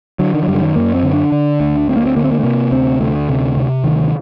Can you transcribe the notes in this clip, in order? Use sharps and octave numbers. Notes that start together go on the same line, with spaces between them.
D3 F#3
D#3
F#3
F#2 G3
D3
D#3
F#2 A#3
C4
D3
D4
D3
D2
D2 C4
A#3
C4
D3 A#3
C4
A#3
A3
C3 A#3
D2 C4
D2 A3
C3
C3
D2 D#3